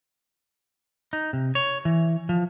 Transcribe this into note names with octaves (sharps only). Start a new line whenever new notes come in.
D#4
C3
C#5
E3
F3